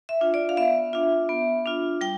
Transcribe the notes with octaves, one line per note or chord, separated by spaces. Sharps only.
E5
D4 F4
D5
F5
B3 E5
D4 F4
B3
D4 F4
G3 G5